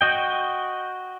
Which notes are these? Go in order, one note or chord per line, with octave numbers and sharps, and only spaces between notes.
F#4 D#5 G5